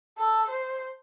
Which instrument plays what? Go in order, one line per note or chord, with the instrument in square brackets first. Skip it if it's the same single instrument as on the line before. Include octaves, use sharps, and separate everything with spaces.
[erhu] A4
C5